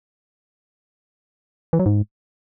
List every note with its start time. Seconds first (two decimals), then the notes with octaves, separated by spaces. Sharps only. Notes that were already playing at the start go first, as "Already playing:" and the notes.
1.73 E3
1.79 F#3
1.86 G#2